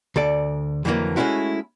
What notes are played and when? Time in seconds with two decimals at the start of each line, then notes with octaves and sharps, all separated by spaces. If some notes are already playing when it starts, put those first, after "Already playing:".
0.16 D2 A4 D5
0.85 F2 D3 E3 F#3 A#3
1.16 G#3 A3 C4 C#4 E4 F#4